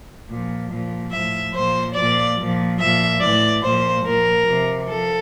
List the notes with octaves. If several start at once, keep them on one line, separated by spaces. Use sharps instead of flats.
A#2 F3
A#2 F3
A2 F3 E5
A#2 F3 C5
A#2 F3 D5
A#2 F3
A#2 F3 E5
A2 E3 D5
A#2 F3 C5
A#2 F3 A#4
C3 F3
F3 A4